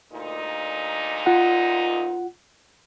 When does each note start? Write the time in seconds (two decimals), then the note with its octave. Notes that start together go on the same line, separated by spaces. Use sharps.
0.11 D2 A#2 D#4
1.26 F4 F#5